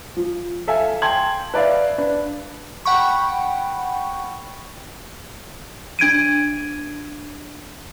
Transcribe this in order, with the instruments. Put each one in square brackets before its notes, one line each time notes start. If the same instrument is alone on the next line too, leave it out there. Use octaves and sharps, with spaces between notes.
[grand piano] F3
A4 E5 F5 G#5
G5 A5 C6 G#6 F#7
B4 D5 E5 F5
D4 B4
[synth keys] F#5 G5 B5 C#6
[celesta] D4 G#6 D7 D#7